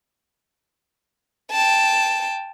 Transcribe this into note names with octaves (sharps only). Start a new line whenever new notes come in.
G5 A5